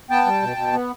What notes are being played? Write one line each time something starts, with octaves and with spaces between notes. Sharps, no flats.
B3 G5 A5
G3
B2
B2
B3